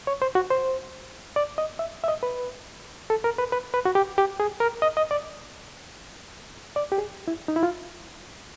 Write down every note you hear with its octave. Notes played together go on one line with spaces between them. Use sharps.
C#5
C5
F#4
C5
D5
D#5
E5
E5
D#5
B4
A4
A#4
B4
B4
B4
F#4
G4
G4
G#4
A#4
D#5
D#5
D5
D5
G4
G#4
E4
D#4
E4
F4